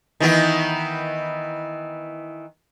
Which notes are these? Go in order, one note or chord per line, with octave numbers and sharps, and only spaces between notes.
D#3 E3 B3